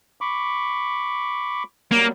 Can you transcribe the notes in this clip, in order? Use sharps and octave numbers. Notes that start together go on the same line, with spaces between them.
B5 C#6 D6
F#3 G3 A#3